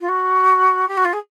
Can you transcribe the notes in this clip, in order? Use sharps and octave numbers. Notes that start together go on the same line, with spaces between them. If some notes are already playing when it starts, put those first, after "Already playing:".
F4
F#4
G4
F#4
F4
G#4